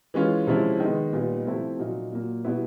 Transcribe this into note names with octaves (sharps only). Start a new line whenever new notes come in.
E3 G#3 C#4 F4
C3 F3 G#3 C#4 E4
D#3 G#3 B3 D#4
A#2 G3 B3 D#4
C3 F3 A3 C4 E4
A#2 F#3 A#3 D#4
A#2 F#3 A#3
B2 G3 B3 E4